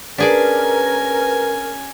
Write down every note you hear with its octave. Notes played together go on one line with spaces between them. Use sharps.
C#4 D4 G#4 A#4 B4 D5 G#5